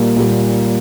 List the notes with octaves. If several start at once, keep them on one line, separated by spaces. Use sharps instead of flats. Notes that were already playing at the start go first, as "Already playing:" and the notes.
Already playing: A#2 G3 A#3
A#2 G3 A#3